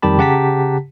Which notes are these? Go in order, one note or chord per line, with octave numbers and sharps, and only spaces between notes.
F2 D#3 G3 G4 A5 B5
C#3 G4 F#5 A5 A#5 B6